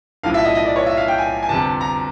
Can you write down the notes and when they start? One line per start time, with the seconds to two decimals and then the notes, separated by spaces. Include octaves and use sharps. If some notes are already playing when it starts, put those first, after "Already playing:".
0.23 B1 A2 F3 F5
0.34 E5
0.45 D#5
0.55 D#5
0.65 D5
0.76 C#5
0.86 E5
0.97 F5
1.08 G5
1.18 G#5
1.43 G#5
1.49 G1 F2 C3 A5
1.81 A#5